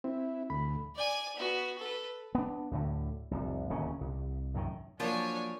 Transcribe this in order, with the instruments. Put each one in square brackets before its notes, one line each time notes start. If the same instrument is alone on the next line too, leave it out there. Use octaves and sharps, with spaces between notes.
[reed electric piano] C4 [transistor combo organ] E4
[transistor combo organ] D2 [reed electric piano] B5
[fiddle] D5 G#5
B3 F#4
A4 B4
[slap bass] B3 D4
D2 A2 D3
F1 C2
D1 D#2 C#3 C#4
C2
C2 F#2 A2 D#3
[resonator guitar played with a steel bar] F3 [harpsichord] F#3 A#3 [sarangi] D4 [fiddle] C#5 G#5